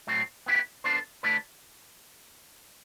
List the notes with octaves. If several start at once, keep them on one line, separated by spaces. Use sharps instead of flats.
A2 F#3 A3 C4
B3 E4 G4
B3 D4 A4 C5
D3 A3 E4 B4 D5